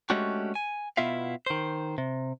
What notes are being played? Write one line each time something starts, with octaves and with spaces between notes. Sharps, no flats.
G#3 A3 C#4 D4 F#4 G4
G#5
B2 B3 E4 F4 E5 F5
D#3 C5
C3